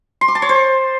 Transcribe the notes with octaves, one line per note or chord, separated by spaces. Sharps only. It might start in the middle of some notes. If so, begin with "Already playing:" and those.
C6
D6
A5
C#5
C5